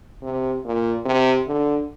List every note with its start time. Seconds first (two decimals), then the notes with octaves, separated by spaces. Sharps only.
0.23 C3
0.65 A#2
1.05 C3
1.48 D3